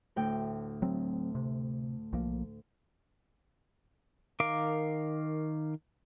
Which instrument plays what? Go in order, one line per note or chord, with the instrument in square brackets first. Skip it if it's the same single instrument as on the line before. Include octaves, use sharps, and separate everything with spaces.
[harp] D2 A2 G5
[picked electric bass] F#3 C4
C3
B1 F3 A#3
[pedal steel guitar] D#3 A#4 F5 D6